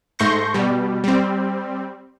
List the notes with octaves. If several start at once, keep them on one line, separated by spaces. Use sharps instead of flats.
G#2 A3 C6 C#6 G6 A#6
B2 G3
G3 C4